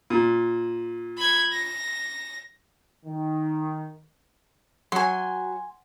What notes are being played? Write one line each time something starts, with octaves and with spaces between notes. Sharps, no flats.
A#2
B5 G#6
A#6
D#3
F#3 G#5 C6